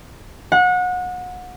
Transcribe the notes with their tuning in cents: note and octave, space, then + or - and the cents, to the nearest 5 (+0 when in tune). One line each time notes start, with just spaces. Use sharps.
F#5 -30